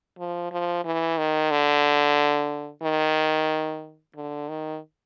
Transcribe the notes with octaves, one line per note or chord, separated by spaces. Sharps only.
F3
F3
E3
D#3
D3
D#3
D3
D#3